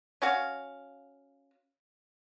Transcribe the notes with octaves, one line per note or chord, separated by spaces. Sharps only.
C#4 F#4 F5